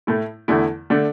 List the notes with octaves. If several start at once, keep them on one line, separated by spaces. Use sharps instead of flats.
A2 A3 E4
E2 D3 A3 E4
D3 A3 D4